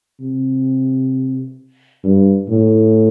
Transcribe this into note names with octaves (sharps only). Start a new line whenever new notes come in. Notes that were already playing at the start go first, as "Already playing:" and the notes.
C3
G2
A2